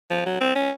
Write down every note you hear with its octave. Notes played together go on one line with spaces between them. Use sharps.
F3
F#3
C4
C#4